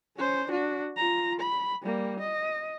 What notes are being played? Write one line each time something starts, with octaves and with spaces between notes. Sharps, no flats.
C#4 C5
D4 F#4
F4 A#5
B5
G3 A#3
D#5